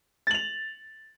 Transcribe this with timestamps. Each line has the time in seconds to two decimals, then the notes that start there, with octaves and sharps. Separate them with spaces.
0.27 A6
0.31 F#7
0.34 F7